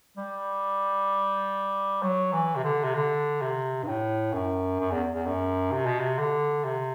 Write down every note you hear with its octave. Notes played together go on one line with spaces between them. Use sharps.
G3
F#3
E3
C3
D3
C3
D3
C3
G2
A2
F#2
F#2
E2
E2
F#2
C3
B2
C3
D3
C3